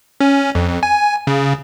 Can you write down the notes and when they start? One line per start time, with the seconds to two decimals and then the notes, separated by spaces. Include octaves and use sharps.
0.21 C#4
0.55 F2
0.83 G#5
1.27 C#3